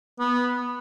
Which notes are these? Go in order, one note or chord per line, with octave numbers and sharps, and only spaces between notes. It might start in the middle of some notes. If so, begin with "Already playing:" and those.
B3